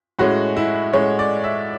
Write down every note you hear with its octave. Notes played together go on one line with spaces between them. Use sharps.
A2 G#3 C#4 F#4
E4
A2 G#3 C#4 C#5
D5
E5